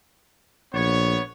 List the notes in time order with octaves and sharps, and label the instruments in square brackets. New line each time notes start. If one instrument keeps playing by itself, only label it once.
[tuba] A#1 [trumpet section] B3 C#5